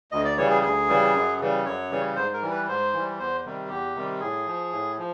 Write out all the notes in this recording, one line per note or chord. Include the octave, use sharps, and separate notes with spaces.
D2 D#5
D5
C#3 E3 G3 C#5
G#4
D2 G#4
C#3 E3 G3
F#2
C#3 E3 G3
F#2 C#5
C#3 E3 G3
G#2 C5
A#4
E3 G3
B4
G#2 C5
E3 G3
E2 C5
C3 D#3 G3
E2 G4
C3 D#3 G3
A2 G#4
F3
A2
F3